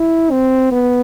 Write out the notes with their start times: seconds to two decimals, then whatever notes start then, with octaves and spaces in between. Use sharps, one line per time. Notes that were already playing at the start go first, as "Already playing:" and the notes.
Already playing: E4
0.31 C4
0.72 B3